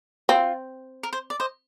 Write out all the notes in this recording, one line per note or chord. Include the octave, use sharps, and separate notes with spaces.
C4 F4
A#4
C5
D5
C5 D#5